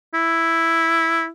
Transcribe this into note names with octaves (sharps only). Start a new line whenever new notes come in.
E4